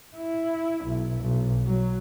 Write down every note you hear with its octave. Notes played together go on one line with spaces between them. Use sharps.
E4
B1
B1
F#3